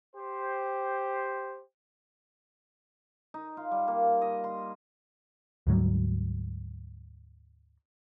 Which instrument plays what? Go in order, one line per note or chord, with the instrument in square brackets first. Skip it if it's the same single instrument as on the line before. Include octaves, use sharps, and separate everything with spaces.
[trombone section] G4 C5
[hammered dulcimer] D#4
F4
G3
A#3
D#5
C6
[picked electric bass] D2 G#2 F#3 G3